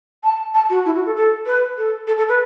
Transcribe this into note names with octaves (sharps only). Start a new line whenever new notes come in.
A5
A5
F#4
E4
F#4
A4
A4
B4
A4
A4
A4
B4